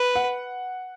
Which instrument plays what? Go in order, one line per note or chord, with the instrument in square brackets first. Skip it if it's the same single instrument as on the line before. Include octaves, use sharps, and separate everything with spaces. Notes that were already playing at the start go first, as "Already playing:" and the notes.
Already playing: [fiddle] B4
[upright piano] F#5